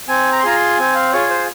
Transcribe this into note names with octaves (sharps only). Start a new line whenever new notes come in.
C4 G#5
A#5
C6
F4 G#4 A#5
C6
C4 G#5
F5
F4 G#4 C#5
C5